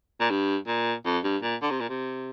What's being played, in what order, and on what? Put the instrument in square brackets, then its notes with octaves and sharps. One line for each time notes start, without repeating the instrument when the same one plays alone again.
[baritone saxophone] A#2
G2
A#2
F2
G2
A#2
D3
C3
A#2
C3